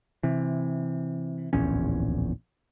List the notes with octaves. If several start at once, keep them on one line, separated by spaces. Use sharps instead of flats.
C3 E3
D1 A#1 E2 C#4